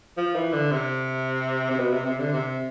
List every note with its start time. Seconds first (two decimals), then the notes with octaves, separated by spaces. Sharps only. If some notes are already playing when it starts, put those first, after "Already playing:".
0.17 F3
0.35 E3
0.53 D3
0.71 C3
1.70 C3
1.79 B2
1.93 C3
2.06 C3
2.20 D3
2.33 C3